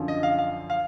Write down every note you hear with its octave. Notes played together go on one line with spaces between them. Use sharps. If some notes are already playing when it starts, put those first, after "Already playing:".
Already playing: F#2 D3 F3
D#5
F5
F5
F5